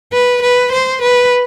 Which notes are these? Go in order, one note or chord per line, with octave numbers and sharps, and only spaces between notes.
B4
B4
C5
B4